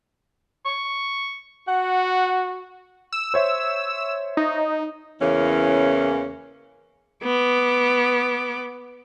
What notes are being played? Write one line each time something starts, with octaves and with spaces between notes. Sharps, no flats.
C#6
F#4 F#5
E6
C5 C#5 E5
D#4
E2 C#3 E3 A#3 C#4
B3 D6